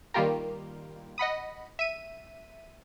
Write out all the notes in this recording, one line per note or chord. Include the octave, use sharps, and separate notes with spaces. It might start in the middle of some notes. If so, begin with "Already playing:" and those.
D#3 G3 A#3 F4 G4 A#4
D#5 F#5 B5 D#6
E5 D#7